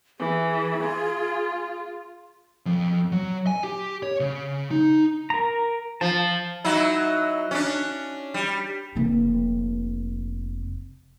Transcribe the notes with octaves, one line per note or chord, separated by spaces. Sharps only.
E3 G#4
F4
F2
F#3
G#5
G4
C#5
C#3
D#4
A#4 A#5
F3 A5
F#3 D#4 E4
C#4 D4
G3
F1 A#3